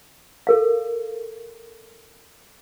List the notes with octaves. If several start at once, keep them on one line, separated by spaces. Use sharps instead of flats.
A4 A#4 F5